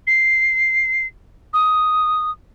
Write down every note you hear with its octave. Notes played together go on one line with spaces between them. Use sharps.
C7
D#6